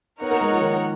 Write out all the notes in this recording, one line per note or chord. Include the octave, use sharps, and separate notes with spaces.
B3 D#4 A#4 C#5 F#5
A#3
G#3
F3
D#3